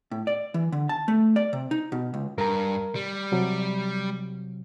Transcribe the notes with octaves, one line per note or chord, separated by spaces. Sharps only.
A2
D5
E3
D3
A5
A3
D5
C3
D#4
B2
C#2
G2 A#4 A#5
G3
C3 F#3